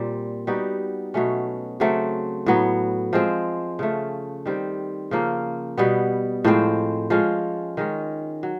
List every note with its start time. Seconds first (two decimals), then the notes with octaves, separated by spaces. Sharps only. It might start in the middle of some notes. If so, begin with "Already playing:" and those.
Already playing: A#2 G3 C4
0.47 G3 B3 D#4 F#4
1.14 B2 F#3 A3 C#4
1.80 C#3 F#3 A3 C4
2.46 A2 F#3 B3
3.13 F3 G#3 C4
3.79 C#3 F3 A3
4.46 D#3 G3 C4
5.11 C#3 F3 A#3
5.78 B2 G3 B3
6.44 A2 F3 G#3 C4
7.10 F3 G#3 C#4 F4
7.77 D#3 G#3 C#4
8.43 F#3